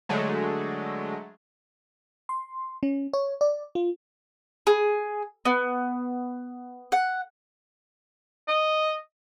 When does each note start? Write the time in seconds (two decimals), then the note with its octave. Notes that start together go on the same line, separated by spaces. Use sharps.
0.09 D3 F#3 G#3 A3
2.29 C6
2.83 C#4
3.13 C#5
3.41 D5
3.75 F4
4.67 G#4
5.45 B3
6.92 F#5
8.48 D#5